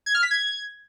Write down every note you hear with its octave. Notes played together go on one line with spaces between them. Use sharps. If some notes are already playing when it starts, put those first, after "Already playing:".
G#6
F6
B6
G#6